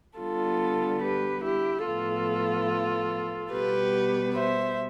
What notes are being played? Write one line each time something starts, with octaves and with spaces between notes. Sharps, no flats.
D3 G3 B3 F4 A4
G4 B4
E4 G4
A2 F3 B3 F4 A4
B2 G3 B3 G4 B4
C5 E5